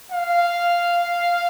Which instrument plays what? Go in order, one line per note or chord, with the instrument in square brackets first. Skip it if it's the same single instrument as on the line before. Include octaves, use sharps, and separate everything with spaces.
[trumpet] F5